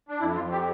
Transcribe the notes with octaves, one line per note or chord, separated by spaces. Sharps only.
D4
F2 E4
F4
F2
G4